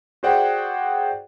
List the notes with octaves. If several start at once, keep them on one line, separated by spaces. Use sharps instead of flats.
F#4 G#4 C5 D5 F#5 G5